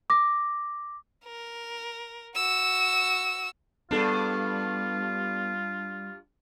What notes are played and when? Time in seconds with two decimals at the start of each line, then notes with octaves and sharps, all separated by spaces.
0.10 D6 A#6
1.25 A#4
2.35 F#4 E6
3.91 G2 G3 B3 D4 F4 G#4 A4